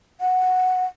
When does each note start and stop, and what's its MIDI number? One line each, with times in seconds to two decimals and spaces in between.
0.21 0.84 78